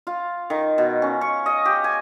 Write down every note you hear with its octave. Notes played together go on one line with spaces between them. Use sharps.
F4
D#3
B2
C#4
C#6
D#5
G4
G#5